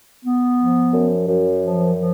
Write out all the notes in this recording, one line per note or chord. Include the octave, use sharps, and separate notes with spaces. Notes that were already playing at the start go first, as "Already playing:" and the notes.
B3
F3
F#2
F#2
F3
F3